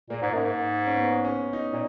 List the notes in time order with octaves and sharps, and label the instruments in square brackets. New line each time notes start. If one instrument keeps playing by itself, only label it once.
[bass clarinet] A#2 [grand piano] A#3
[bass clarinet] G#2
F#2
G#2
[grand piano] C#4
B3
C#4
D#4
[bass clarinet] A#2